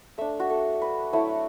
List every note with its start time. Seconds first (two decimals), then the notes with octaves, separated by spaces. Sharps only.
0.18 A3 D4 E5
0.40 F#4
0.50 A4
0.82 B4
1.13 F#3 A3 E4